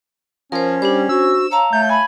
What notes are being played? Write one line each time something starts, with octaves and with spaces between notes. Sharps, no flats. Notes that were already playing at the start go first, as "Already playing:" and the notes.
F3 C#4 A#4 C5
G3 D4 G4 C5
F#4 E6
C#5 F5 A5 A#5
A3 G6
G#5 B5